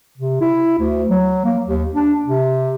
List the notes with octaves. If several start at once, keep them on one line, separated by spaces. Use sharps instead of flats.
C3
E4
D2
F#3
A#3
D#2
D4
C3